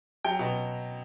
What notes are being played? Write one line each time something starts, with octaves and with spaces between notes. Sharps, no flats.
F#3 G5
B2